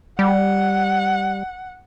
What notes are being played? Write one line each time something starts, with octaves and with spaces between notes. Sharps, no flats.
G3 F#5